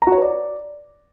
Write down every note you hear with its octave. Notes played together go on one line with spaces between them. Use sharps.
A#5
F#4
C#5
B4
D5